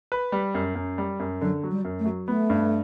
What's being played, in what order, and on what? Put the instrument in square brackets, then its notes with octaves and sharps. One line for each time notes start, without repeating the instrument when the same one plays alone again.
[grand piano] B4
G3
F#2
F#2
G3
F#2
[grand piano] D3 [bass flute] F#3
[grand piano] F#3
[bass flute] G3
[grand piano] F#2
[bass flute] A3
[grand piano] F#3
[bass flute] A3 [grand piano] B3
[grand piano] G2